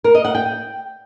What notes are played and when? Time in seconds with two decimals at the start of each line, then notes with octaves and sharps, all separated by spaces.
0.04 A#4
0.14 D#5
0.25 F#5
0.35 G5